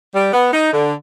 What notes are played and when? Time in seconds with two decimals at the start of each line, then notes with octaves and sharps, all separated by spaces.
0.14 G3
0.33 B3
0.53 D#4
0.72 D3